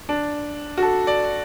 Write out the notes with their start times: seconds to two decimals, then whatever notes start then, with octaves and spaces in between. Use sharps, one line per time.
0.09 D4
0.78 F#4
0.82 A4
1.07 D5